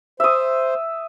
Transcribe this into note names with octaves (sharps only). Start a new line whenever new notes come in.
C5 E5 D#6